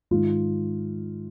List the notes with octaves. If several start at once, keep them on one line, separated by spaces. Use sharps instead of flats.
G#2 D#3 G#3 F4